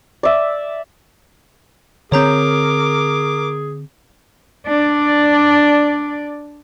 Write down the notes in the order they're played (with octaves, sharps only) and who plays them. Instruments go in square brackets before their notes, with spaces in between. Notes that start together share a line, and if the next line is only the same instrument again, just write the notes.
[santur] D5 E5
[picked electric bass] D3 C4 [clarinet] G#4 [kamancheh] A#4 D6 [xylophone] C#5 A#5 G6
[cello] D4 D5